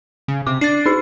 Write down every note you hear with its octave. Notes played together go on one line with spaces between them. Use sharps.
C#3
C3 D6
D4 A6 C7
D#4 G#4 C7